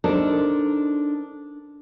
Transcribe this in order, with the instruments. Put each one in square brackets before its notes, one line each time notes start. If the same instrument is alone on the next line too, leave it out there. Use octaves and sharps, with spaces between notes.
[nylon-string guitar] D4 D#4 A4 A#4 C5